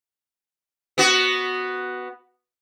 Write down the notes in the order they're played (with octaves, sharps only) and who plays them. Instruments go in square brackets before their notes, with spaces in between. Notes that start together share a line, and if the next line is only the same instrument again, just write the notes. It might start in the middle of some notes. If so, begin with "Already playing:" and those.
[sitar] B3 F#4